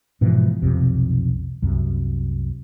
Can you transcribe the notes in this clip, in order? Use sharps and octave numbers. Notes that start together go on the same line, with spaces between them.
G#2 B2 E3 F3
B1 F2 C3
C2 F#2